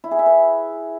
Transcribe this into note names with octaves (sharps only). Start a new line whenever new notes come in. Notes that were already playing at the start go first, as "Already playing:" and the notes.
E4
G#4
E5
B4